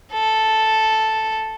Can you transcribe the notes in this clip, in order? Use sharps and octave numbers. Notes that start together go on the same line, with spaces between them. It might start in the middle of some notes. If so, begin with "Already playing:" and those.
A4